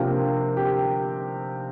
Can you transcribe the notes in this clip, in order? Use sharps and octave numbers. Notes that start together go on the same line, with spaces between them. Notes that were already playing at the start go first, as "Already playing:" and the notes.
Already playing: C3 F3 A#3 D4 F4 G4 G5
G4 G5